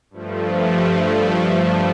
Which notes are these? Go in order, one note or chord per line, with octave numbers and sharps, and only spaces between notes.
G2 F3 A3